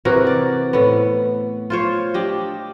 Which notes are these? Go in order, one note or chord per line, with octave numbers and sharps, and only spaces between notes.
C3 E3 F#4 A#4
D5
A2 B3
F4 C5 C#5
D4 G4 D#5